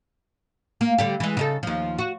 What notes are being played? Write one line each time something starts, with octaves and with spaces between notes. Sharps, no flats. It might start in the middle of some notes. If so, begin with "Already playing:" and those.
A#3
D3 G3 G4
E3 G#3
C#3 D#4 A4
D#2 F3
F#4